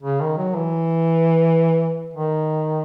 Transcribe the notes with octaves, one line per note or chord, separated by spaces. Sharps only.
C#3
D#3
F#3
E3
D#3